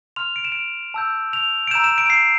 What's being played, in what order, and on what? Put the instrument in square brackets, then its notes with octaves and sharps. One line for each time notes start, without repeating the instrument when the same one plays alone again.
[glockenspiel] C6 F6 F7
D7
E7
D7
A5 E6 G6
F7
D7
A#5 E6 G6 E7
E7
D7
C7